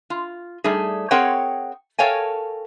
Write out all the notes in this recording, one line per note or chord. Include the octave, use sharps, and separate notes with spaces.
F4
G3 A3 D#4 G#4
C4 G#4 A#4 C#5 F#5 G5
A4 A#4 C#5 F5 G5 G#5